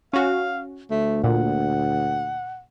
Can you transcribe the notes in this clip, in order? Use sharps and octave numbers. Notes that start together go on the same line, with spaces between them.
C#4 F#4 F5
D2 A3
A#2 F#5